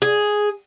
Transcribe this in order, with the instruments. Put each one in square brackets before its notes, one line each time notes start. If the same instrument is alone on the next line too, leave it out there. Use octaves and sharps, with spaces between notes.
[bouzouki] G#4